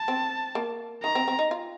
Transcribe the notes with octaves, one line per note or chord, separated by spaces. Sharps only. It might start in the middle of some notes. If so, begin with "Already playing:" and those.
Already playing: A5
C4
A#3
D#3 A#5
C4
C4
D#4
F4